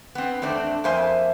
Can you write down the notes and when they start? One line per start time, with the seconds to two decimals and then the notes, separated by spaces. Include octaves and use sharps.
0.15 B3 C4
0.42 E2 A3 C4 D4
0.84 F2 A#3 C5 E5 G#5